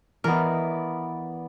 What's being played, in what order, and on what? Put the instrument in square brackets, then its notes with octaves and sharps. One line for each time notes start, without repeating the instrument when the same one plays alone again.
[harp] E3 D#5 [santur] B3 D5 [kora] A#4